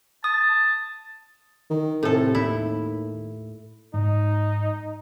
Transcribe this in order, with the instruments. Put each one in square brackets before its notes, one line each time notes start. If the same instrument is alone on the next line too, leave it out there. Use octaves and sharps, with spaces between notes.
[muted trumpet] A5 [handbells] D#6
[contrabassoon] D#3
[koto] A2 A4 [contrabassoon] C3
[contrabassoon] D#2 [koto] E4
[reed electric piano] G#2 [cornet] D#4